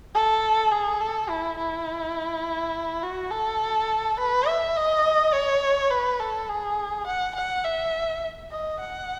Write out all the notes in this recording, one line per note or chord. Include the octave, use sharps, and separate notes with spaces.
A4
G#4
A4
E4
E4
F#4
A4
B4
E5
D#5
C#5
B4
A4
G#4
F#5
F#5
E5
D#5
F#5